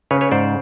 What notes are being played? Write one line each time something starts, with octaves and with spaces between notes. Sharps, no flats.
C#3 B4 C#5
B4 C#5
G#2 C5 D5